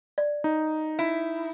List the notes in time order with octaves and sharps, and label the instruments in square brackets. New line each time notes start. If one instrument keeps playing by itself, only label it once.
[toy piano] D5
[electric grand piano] D#4
[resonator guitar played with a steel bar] E4